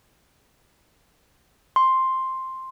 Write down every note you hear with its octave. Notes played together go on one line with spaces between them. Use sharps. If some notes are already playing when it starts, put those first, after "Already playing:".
C6